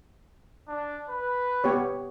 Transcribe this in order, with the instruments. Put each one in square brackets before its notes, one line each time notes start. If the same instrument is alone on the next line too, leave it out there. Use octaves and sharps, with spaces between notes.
[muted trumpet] D4
B4
[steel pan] B3 G4 C#5